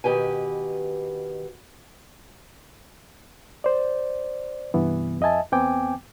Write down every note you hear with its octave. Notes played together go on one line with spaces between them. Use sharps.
B2 D#3 G4 B4 G#5
C5 D5
G2 C3 E3 B3
F2 D#5 E5 G#5 A5
E2 B3 C4 G5 G#5 D6